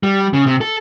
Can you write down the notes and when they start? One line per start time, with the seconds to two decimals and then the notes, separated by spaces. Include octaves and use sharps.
0.03 G3
0.33 C#3
0.46 C3
0.61 A4